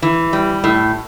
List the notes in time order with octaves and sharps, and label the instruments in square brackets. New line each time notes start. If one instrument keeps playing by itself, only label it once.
[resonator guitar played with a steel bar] E3
G3
A2